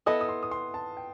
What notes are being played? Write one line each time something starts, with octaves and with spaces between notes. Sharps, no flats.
B3 E4 A4 D#5 D#6
D#6
C6
D#6
C6
A5
G5